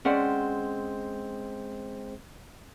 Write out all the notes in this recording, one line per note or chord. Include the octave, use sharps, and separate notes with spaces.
G#3 C4 C#4 C5 D5 F#5